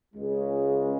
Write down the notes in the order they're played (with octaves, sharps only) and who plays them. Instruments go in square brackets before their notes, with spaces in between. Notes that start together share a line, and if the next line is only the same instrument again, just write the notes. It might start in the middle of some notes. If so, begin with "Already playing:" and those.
[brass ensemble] C#2 C#3 G#3